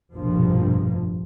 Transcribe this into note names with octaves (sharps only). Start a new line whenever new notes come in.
F1 A#1 G2 B2 F3 A#3